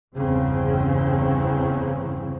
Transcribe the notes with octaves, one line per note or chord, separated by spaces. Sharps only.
G1 E2 C#3 C4